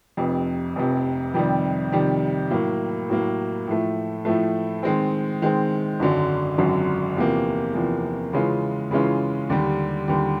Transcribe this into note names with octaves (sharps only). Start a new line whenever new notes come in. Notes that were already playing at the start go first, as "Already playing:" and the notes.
F1 F2 C3
F1 F2 C3
F2 C3 D#3 G3
F2 C3 D#3 G3
A2 F#3 A#3
A2 F#3 A#3
A2 F3 A3
A2 F3 A3
D#3 G#3 C4
D#3 G#3 C4
G#1 F#2 D3 F#3
G#1 F#2 D3 F#3
E2 C3 F3 A#3
E2 C3 F3 A#3
C#3 E3 G#3 C#4 F4
C#3 E3 G#3 C#4 F4
D#2 D3 G3
D#2 D3 G3